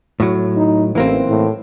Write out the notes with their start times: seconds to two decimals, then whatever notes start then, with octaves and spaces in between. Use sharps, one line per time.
0.20 A2 F#3
0.56 D#4
0.95 A1 E3 A#3 C4
1.28 A2